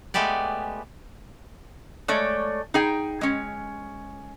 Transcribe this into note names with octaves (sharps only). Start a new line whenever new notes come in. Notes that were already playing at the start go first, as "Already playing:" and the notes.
G#3 A3 B3 G4 D5
G#3 A3 C#5 D5
D#4 G#4 G5
G#3 C#4